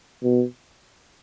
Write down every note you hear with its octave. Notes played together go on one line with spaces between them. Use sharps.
B2